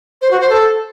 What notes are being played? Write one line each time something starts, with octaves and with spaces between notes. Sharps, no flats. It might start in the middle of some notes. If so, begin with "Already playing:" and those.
C5
F#4
C5
A4